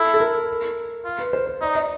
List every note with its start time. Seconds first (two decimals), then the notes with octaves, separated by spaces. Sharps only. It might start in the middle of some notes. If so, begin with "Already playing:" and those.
Already playing: E4 A4
0.14 A4
0.20 A#4
1.05 F4
1.19 B4
1.33 C5
1.47 C5
1.62 D#4 D5
1.75 D#5